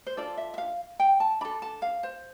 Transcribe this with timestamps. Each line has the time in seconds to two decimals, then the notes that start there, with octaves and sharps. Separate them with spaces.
0.07 C5
0.17 D4 F4 A4 D5
0.37 E5
0.54 E5
0.58 F5
1.00 G5
1.20 A5
1.41 D4 B5
1.45 A4
1.62 A5
1.82 F5
2.03 C5